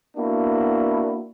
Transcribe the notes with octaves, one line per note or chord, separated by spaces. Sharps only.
A#3 B3 D4 E4 F#4